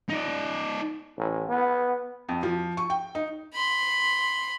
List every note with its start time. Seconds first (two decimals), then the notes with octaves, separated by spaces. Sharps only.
0.09 D#4 D5
1.17 A1
1.49 B3
2.29 F2
2.43 F3
2.77 C#6
2.90 G5
3.15 D#4
3.54 B5 C6